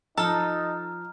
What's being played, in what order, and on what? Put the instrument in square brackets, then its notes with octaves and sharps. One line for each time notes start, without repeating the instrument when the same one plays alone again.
[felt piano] F3 [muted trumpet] D#4 [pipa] A4 [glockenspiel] A#5 F6